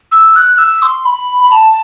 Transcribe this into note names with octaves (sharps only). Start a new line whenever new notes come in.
E6
F#6
E6
C6
B5
B5
A5